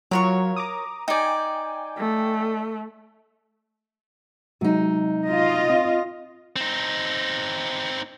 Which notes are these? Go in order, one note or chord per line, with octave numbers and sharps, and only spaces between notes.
F#3 F4 A#4 C#5 C#6
A#5 D6 D#6
D#4 D5 G5 G#5
A3
C3 F#3 G#3 D#4 F#4
F4 D#5
C4 F5
C4 D#4